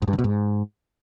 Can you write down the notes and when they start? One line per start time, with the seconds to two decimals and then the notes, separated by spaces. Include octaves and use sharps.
0.02 G#2
0.08 G2
0.13 D3
0.19 B2
0.24 G#2